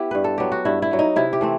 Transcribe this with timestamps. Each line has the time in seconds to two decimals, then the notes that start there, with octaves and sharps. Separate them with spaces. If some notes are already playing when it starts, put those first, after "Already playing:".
Already playing: B3 E4 G4
0.11 G2 B4
0.24 A4
0.38 F#3 B3 G4
0.52 F#4
0.65 G2 E4
0.82 E4
0.91 F#3 B3
0.99 D#4
1.16 C3 E4
1.33 G4
1.41 E3 A3 C4